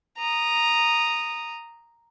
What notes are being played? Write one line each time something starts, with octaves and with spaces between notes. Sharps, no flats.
A#5 D#6